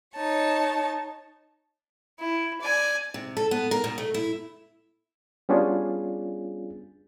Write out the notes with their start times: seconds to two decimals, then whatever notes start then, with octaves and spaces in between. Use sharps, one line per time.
0.15 D#4 C#5 A5
2.19 E4
2.61 D5 G#5
3.14 C3
3.37 A4
3.51 B3
3.71 A#4
3.84 B2
3.98 A3
4.14 E4
5.49 G3 B3 C#4 D4 F4 G#4